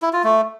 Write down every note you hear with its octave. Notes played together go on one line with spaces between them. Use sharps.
E4
F4
A3